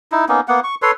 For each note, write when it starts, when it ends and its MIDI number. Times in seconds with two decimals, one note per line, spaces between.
0.12 0.25 63
0.12 0.25 64
0.29 0.41 58
0.29 0.41 59
0.29 0.41 61
0.29 0.41 63
0.48 0.60 58
0.48 0.60 59
0.48 0.60 78
0.64 0.75 85
0.82 0.91 69
0.82 0.91 71
0.82 0.91 73
0.82 0.91 84